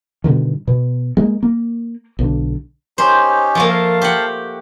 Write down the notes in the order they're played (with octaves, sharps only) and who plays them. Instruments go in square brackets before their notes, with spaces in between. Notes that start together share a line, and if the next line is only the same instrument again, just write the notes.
[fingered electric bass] G2 B2 D3 D#3
B2
G#3 A#3
A#3
B1 D3
[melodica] C#4 D#4 G4 [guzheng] C5
[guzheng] F3 A3 A#3
[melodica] F5 A5
[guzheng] G4 F#5